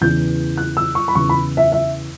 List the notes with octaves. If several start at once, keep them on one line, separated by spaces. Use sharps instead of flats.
E2 C#3 E3 G6
F#6
E6
C#6
B5
E2 C#3 E3 C#6
B5
E5
E5